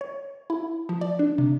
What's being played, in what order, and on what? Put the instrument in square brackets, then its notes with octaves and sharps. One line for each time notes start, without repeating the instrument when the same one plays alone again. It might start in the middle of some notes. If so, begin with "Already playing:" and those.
[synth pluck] C#5
E4
F3
D5
D4
C3